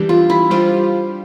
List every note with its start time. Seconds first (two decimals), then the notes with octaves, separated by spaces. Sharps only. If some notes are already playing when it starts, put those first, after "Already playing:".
Already playing: E3 G3 D4 G4
0.09 F4
0.30 E4
0.50 G3 D4 F4 G4 C5 F5